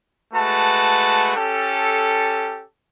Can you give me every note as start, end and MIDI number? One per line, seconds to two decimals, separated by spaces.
0.34 1.31 56
0.34 1.31 57
0.34 1.31 66
0.34 1.31 71
0.34 1.31 81
1.36 2.63 61
1.36 2.63 67
1.36 2.63 69